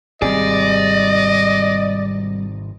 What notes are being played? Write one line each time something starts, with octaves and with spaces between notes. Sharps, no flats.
G#1 C3 G3 C4 G#4 D5 D#5